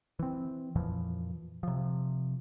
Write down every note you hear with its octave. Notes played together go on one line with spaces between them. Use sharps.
E3 C4
F2 A#2 E3 F3
C3 F3